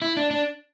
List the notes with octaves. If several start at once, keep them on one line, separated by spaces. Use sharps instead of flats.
E4
D4
D4